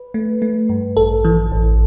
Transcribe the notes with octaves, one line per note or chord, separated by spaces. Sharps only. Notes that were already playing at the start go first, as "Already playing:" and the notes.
Already playing: B4
A3
A3
G2
A1 A4
E3
A1